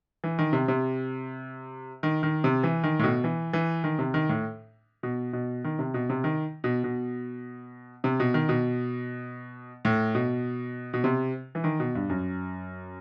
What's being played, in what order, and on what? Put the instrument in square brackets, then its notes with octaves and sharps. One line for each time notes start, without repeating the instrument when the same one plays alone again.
[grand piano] E3
D#3
C3
C3
D#3
D#3
C3
E3
D#3
A2
B2
E3
E3
D#3
C3
D#3
A2
B2
B2
D#3
C3
B2
C3
D#3
B2
B2
C3
B2
D#3
B2
A2
B2
B2
C3
E3
D#3
B2
G2
F#2